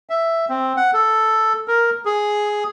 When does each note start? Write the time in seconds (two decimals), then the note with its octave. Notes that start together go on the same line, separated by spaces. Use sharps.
0.10 E5
0.49 C4
0.76 F#5
0.93 A4
1.68 A#4
2.05 G#4